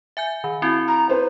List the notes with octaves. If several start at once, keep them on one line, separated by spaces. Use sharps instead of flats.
E5 G#5 G6
D#3
C4 E4 F#4
A#5
B4 C5